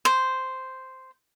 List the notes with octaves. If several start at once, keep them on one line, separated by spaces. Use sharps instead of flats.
C5